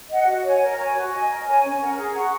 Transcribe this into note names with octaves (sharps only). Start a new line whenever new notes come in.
D#5 F#5
F#4
C#5 G#5
A#4
C#5 G#5
F#4
D#5 G#5
A#4
C#5 G#5
C#4
A#4 F#5
G#4
F#5 A#5 C#6